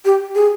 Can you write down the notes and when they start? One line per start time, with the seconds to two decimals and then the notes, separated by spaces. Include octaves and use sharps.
0.05 G4
0.35 G#4